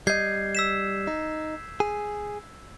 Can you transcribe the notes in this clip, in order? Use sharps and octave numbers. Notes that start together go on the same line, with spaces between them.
G3 D#5 G6 G#6 C7
E6 B6 E7
D#4
G#4